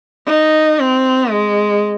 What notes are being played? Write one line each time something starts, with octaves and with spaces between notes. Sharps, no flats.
D#4
C4
G#3